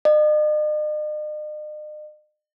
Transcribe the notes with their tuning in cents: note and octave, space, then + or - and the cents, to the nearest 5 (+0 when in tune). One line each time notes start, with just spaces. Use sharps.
D#5 -45